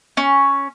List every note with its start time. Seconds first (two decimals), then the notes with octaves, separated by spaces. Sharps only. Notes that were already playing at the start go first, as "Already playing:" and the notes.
0.17 C#4